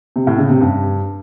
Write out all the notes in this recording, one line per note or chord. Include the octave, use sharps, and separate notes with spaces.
C3
A2
C#3
C3
G2